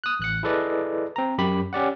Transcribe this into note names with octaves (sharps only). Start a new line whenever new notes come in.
D#6 F#6
A1 F#6 C#7
E4 G#4 A4 B4 D5 D#5
C4 A#5
F#2 G4 B5
C#4 G4 D5 F#5